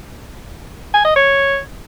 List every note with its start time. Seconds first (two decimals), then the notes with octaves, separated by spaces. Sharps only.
0.94 G#5
1.05 D#5
1.16 C#5